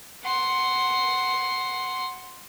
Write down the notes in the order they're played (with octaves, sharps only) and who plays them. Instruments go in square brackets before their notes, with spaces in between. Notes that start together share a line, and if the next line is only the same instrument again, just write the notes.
[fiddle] F#5 C6